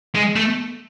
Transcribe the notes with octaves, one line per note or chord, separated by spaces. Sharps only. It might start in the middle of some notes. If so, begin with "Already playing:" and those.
G#3
A3